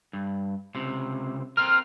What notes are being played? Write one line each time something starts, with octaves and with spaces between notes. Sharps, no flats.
G2
C#2 C3
C4 F4 A#4 F6